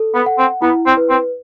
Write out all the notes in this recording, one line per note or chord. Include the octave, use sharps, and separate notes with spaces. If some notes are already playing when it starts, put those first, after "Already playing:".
Already playing: A4
B3
F#5
C4
B3 E4
C4
B4
C4